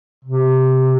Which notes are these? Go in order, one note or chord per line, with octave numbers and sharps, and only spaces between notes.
C3